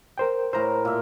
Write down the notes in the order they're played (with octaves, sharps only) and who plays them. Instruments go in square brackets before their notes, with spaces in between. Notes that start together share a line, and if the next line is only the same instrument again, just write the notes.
[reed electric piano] A#4 C5 G5
[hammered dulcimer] A2 A#4 [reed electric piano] C5 A#5
[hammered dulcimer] A#2 E5